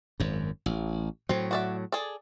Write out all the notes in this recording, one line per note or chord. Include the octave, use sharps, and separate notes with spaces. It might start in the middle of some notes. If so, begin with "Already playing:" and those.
G#1 F#2
A1
A2 F#3 C4
F#4 D5 E5
G#4 A4 D5